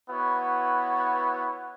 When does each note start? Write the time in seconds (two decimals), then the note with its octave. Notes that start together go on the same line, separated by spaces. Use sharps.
0.10 B3 E4 F#4 B4 C#5